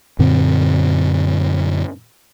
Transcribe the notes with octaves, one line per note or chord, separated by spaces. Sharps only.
F#2 A#2 D3 C4